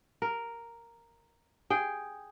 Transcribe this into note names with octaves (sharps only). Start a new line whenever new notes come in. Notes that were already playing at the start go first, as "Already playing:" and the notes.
A#4
G#4 G5